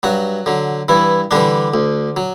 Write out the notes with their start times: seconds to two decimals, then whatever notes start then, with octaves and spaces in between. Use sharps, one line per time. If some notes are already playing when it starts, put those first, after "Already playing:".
0.03 G2 F#3 F#4
0.46 D3 F#3
0.89 G2 E3 E4
1.31 D3 E3 G3 D4
1.74 D2
2.17 F#3